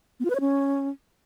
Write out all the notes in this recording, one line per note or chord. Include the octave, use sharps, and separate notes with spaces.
B3
F4
B4
C#5
C#4